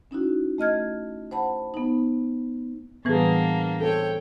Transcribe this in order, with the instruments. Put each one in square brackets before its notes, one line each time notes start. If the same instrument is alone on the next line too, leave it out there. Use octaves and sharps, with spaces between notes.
[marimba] C#4 D#4 E4 F#4
A3 D#5 F6 G#6
C5 F#5 A5 B5
B3 D#4
[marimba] A2 E3 G3 [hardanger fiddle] A#3 D4 [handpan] B3 G#4
[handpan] A4 C5 [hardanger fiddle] C#5 G5